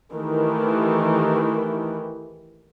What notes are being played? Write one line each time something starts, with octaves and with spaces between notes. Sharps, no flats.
D#3 E3 A3 G4